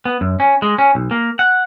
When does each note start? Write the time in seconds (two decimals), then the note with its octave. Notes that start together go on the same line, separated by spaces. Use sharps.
0.06 B3
0.21 F#2
0.40 C#4
0.62 G#3
0.78 C#4
0.95 B1
1.11 A#3
1.39 F#5